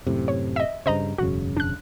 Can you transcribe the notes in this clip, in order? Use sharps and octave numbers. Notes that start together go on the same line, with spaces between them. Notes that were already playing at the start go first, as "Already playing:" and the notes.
F#2 A2 C3
C#5
D#5 E5
G2 C#3 C5 D#5 A#5
E1 F#2 C#3 F#4
D4 F#6